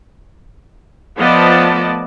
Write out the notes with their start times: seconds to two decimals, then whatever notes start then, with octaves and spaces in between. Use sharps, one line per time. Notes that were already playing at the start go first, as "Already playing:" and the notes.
1.18 F3 A3 B3 D5 D#5 A5